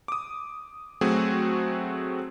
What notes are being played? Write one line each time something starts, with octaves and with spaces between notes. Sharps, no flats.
D6 D#6
F#3 A3 C4 F#4 G#4